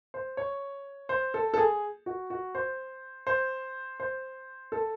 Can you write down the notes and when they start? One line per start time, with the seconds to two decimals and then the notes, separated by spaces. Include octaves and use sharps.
0.14 C5
0.37 C#5
1.09 C5
1.34 A4
1.54 A4
1.58 G#4
2.06 F#4
2.30 F#4
2.55 C5
3.27 C5
4.00 C5
4.72 A4